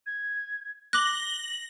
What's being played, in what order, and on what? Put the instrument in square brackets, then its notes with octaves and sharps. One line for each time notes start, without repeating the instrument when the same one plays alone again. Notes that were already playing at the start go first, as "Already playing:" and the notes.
[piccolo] G#6
[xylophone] D6 F#6 [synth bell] A#6 F#7 [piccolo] G7